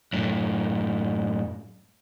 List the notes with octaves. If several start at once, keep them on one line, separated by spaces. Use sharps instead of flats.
F#2 A2